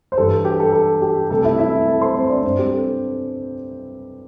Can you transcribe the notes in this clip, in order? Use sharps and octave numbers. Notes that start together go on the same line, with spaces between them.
C5
G2 E3 G3 A4
G4
A4
A4
G4
C2 C3 A3 C4 A4
E4 E5
E4 E5
A4 A5
C5 C6
C4 C5
D4 D5
G2 G3 C4 D4 C5
G4
A4